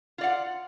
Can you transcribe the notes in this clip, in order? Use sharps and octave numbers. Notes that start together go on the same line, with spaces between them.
F4 D5 F#5